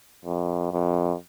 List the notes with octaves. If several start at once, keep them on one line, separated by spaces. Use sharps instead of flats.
F2
F2